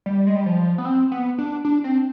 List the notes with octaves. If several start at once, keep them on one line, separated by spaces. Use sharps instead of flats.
G3
G#3
G3
F3
B3
C4
B3
D4
D4
C4